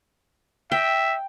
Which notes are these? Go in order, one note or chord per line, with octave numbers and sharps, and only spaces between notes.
E5 G5